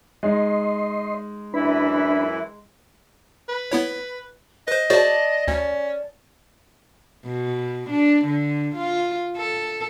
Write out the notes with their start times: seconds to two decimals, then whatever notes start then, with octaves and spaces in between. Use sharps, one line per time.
0.23 G#3 D#4 D#5 C6
1.54 F#2 E3 D4 E4 B4 B5
3.49 B4
3.72 B3 E4 C#5
4.68 B4 C5 D#5
4.90 F#4 G#4 C5 D5 A5
5.48 D2 C#4
7.25 B2
7.90 D4
8.25 D3
8.76 F4
9.37 A4